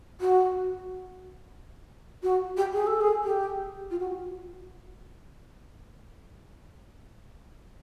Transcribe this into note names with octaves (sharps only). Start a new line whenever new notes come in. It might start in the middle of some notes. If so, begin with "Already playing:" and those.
F#4
F#4
G4
G#4
A4
G#4
G4
F4
F#4